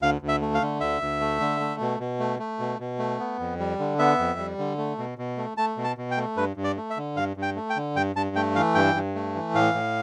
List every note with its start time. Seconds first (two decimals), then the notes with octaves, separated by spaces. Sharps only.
0.02 D2 F5
0.22 D2
0.28 E5
0.41 A3
0.55 F5
0.62 D3
0.81 D2 E5
1.01 D2
1.20 A3
1.40 D3
1.60 A3
1.81 B2
2.00 B2
2.20 A3
2.39 A3
2.59 B2
2.80 B2
2.99 A3
3.20 B3
3.40 F2
3.59 G3
3.79 D3
3.99 B3 E5
4.19 F2
4.39 G3
4.58 D3
4.78 A3
4.98 B2
5.18 B2
5.37 A3
5.58 A3 A5
5.77 B2
5.84 A5
5.97 B2
6.11 G5
6.17 A3
6.37 G2 B4
6.57 G2
6.64 D5
6.77 A3
6.90 E5
6.97 D3
7.16 G2 F5
7.37 G2
7.42 G5
7.56 A3
7.70 G5
7.76 D3
7.96 G2 G5
8.16 G2 A5
8.36 A3 G5
8.56 E3 F5
8.75 G2 G5
8.95 G2
9.15 A3
9.35 E3
9.54 A2 F5
9.74 A2